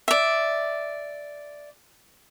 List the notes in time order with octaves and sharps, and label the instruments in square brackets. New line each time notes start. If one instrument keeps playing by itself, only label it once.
[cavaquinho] D5 E5